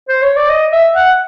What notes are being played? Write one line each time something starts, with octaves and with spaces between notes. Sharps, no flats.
C5
C#5
D5
D#5
E5
F#5